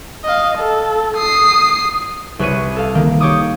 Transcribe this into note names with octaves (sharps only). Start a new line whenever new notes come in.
D#5 F5
A4
D#6 C7
C2 B4 C#5 D#7
A4 F5
D#3 A#3
G4 C#5 D6 D#6